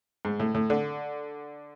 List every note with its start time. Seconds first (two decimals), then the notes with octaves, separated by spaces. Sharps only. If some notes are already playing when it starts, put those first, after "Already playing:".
0.25 G#2
0.40 A2
0.54 A2
0.70 D3